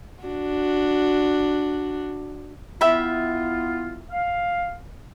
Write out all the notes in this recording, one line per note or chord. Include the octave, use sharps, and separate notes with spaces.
D4 F#4
B3 E4 F4 E5 G5 B5
F5